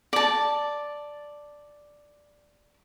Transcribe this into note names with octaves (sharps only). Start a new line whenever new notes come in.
D5 A5